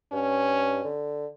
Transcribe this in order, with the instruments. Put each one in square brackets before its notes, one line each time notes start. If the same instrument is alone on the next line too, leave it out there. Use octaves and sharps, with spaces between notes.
[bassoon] G2 [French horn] C#4
[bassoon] D3